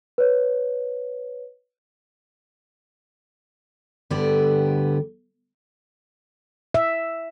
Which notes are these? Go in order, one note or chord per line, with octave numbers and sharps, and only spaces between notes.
B4 C#5
D2 G2 D3 B3 G4 D5
E5